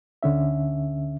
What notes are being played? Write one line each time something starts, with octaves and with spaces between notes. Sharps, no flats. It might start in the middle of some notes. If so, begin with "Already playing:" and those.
D2 D3 C#4 E5